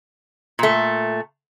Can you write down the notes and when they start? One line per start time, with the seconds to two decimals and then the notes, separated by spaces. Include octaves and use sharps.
0.59 A#2 A3